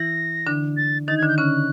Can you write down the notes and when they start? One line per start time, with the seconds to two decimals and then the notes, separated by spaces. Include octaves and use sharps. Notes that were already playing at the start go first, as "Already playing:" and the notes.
Already playing: E3 E4 A#6
0.47 D3 D4
0.77 A6
1.08 D#3 D#4 A6
1.18 G#6
1.22 D3 D4
1.28 G6
1.37 C#3 C#4 F#6